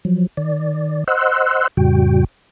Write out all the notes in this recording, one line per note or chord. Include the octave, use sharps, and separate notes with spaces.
F3 F#3
D#3 D5
C5 D#5 F#5 C6 E6 F#6
F2 A2 C#3 G3 F#4 G5